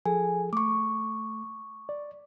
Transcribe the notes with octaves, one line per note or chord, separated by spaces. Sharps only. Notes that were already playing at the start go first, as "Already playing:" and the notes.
F3 G#4 A4 G#5
A3 C#6 D6
D5